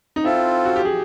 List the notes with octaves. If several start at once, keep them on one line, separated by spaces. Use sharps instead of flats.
D#4
C4 E4 F4 A4
F#4
G4
G#4